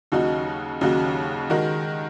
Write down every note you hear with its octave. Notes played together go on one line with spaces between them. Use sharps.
D#2 C#3 F#3 D#4 F#4
D#2 C#3 F#3 D#4 F#4
D#3 G#3 F#4 A#4